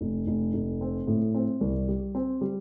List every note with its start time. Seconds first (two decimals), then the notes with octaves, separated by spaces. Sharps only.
0.01 F1
0.27 F1
0.54 F1
0.81 C4
1.07 A2
1.35 C4
1.61 C2
1.88 G3
2.15 C4
2.41 G3